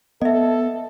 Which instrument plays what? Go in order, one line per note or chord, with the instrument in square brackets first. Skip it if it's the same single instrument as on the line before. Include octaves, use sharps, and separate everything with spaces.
[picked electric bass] B3 [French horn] A4 [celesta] D#5 E5